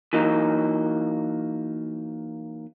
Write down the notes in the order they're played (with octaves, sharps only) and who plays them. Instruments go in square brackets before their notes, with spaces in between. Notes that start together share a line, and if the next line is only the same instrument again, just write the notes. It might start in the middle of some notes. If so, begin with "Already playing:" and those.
[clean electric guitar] E3 F#3 A#3 D#4